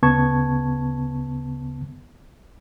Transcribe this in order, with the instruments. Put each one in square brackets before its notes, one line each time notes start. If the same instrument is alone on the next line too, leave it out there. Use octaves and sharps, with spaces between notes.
[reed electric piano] D2 C#3 B3 A5 C#6 G#6